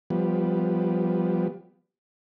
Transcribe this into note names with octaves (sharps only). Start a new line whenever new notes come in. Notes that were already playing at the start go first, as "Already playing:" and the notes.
F3 G3 B3